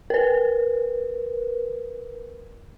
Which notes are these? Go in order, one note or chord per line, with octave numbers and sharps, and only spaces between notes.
A#4 B4